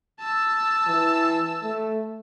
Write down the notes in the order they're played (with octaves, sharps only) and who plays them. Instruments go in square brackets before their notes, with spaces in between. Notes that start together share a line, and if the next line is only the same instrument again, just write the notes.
[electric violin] A5 E6
[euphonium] E3
A3